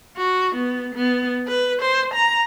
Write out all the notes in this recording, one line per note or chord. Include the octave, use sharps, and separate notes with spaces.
F#4
B3
B3
B4
C5
A#5